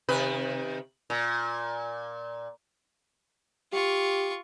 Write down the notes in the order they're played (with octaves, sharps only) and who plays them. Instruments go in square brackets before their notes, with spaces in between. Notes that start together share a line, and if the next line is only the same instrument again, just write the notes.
[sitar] C3 D#3 B4
A#2
[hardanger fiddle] F4 C#6 [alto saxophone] G4